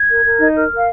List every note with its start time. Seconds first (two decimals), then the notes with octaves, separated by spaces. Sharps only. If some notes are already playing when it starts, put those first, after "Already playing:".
Already playing: G#6
0.09 A#4
0.24 A#4
0.40 D#4
0.56 A#4 F6
0.71 A#4
0.77 F5